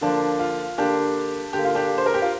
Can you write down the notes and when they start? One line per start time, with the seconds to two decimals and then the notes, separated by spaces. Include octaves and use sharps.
0.01 D3 F3 A#3 D4
0.39 F4
0.78 D3 A#3 D4 G4
1.53 D3 A#3 G4
1.65 F4
1.75 D4 G4
1.98 C5
2.06 A#4
2.14 G4
2.22 F4